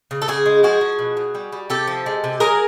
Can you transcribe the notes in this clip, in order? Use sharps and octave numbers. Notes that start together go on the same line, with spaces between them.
C#3
A4
C#3 F#4 G#4
G#3
F3 F#4 G#4
F3
B2
B2
G3
G3
C3 G4 A4
F3
G#3
C3
F#3 G#4 A#4